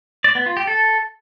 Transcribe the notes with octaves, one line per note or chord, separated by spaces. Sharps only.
D5
B3
F4
G4
A4